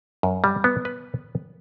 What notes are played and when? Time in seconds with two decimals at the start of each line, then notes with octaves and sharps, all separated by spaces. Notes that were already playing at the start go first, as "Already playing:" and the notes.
0.23 F#2
0.44 G3
0.64 B3
0.85 B4